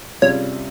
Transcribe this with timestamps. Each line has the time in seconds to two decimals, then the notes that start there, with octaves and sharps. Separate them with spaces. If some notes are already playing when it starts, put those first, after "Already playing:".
0.22 C3 G3 C#4 F4 G#4 C#5